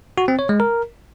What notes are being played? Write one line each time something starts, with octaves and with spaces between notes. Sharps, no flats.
F#4
C4
C#5
G#3
A#4